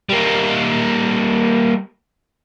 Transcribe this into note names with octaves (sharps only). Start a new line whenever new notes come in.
G3 A#3